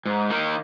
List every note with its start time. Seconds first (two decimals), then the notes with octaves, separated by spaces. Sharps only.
0.06 G#2
0.30 D#3 A#3 D#4